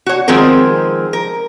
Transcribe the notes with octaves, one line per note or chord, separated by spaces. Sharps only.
F#4 C#5
D#3 F3 G#3 C4 G#4 A#4
A#4